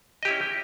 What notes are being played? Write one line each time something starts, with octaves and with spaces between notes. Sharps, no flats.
C#4 E4 G4 D#5